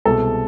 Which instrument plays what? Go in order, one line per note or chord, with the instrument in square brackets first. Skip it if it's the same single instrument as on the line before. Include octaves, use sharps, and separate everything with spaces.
[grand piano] C2 B2 G#3 A4